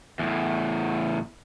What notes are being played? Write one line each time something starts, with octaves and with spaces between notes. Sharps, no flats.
E2 A2